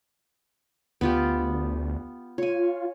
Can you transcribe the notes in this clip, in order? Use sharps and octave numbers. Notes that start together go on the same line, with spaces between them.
D2 B3 F4 G4
F4 C#5 G#5